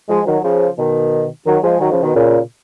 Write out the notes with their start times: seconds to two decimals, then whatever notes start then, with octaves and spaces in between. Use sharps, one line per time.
0.09 F3 G#3
0.26 D#3 F#3
0.43 C#3 F3
0.78 B2 D#3
1.46 D#3 F#3
1.63 F3 G#3
1.80 D#3 F#3
1.91 C#3 F3
2.03 B2 D#3
2.15 A#2 C#3